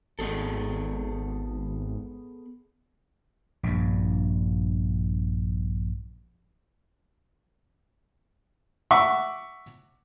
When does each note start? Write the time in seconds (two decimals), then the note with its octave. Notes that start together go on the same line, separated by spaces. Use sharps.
0.19 G#1 B3 G#4 A4
3.63 A#1 G2
8.91 E5 F#5 C#6 D6